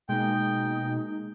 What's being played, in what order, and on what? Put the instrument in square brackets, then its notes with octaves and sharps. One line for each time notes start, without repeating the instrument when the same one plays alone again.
[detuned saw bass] B2 [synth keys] G#3 A#3 [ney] D#4 [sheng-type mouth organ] G5